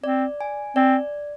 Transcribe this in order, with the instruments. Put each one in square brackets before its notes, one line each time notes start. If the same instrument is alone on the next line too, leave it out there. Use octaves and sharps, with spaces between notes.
[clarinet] C4 [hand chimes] D5
[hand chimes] G#5
[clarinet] C4 [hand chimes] D5